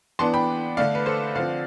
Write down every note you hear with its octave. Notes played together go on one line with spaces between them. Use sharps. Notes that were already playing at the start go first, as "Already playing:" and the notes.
E3 B3 D4 A5 C6
G5 B5
D3 A3 D4 D5 F5
B4
A4 C5
D3 F3 C4 D5 F5